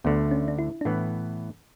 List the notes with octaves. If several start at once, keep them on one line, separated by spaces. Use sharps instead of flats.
D2 D3 A3 B3
C#4
D4
E4
D4
A2 E3 B3 E4